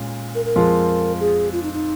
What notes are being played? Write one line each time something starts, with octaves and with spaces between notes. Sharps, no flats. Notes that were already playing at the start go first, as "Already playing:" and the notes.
Already playing: A#2 G#3 C#4
A#4
A#4
F2 F3 G#3 F4
G#4
F4
D#4
D#4